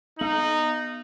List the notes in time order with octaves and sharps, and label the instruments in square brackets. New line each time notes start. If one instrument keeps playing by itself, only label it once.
[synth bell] B3 F#7 [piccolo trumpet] D#4